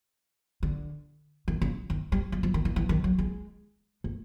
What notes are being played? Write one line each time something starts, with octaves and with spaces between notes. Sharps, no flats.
D3
D#3
C#3
D#3
G3
F#3
F3
D#3
E3
E3
D#3
F#3
G#3
A3